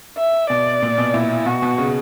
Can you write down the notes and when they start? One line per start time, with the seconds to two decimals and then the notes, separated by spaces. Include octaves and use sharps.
0.18 E5
0.50 B2 D5
0.82 A#2
0.98 B2
1.14 A#2 E4
1.46 B2 F#4
1.62 B2
1.78 C#3